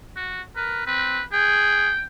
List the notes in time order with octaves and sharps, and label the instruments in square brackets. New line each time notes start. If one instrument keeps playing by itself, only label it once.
[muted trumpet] F#4
[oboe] A#4 [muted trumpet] B4
[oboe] C4 [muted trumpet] B4
[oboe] G#4 [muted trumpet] G5